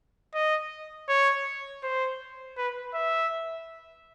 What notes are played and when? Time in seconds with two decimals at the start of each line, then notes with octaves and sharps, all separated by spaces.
0.34 D#5
1.08 C#5
1.83 C5
2.57 B4
2.94 E5